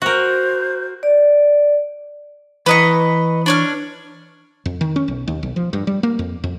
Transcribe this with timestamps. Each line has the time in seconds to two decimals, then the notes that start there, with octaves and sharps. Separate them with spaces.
0.02 F#4 A#4 C5
1.03 D5
2.66 E3 E4 B4 D#5 A#5 C#6
3.46 D4 C#5 F6
4.66 F2
4.81 D#3
4.96 C#4
5.08 B1
5.28 D#2
5.43 B1
5.56 F3
5.73 G2
5.87 G3
6.03 A#3
6.19 F2
6.44 F2